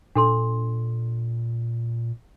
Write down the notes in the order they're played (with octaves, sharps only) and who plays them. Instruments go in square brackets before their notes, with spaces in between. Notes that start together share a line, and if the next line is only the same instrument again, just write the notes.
[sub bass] A#2 [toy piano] D4 A4 C6